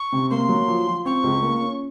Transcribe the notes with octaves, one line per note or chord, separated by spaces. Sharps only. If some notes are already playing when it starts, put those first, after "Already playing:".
Already playing: C#6
C3
A#3 C6
F#3
F3
F3
C4 C#6
C#2
A#3
C#4